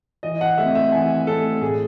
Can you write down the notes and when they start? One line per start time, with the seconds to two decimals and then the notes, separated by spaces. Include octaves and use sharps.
0.23 E3 D#5
0.41 F#5
0.58 A3 C4 E5
0.75 E5
0.92 E3 G#5
1.27 A3 C4 A4
1.61 A2 G#4